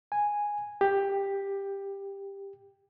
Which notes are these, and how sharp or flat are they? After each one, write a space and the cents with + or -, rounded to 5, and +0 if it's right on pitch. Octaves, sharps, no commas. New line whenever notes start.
G#5 -5
G4 +10